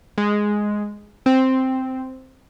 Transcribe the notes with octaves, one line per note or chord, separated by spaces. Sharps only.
G#3
C4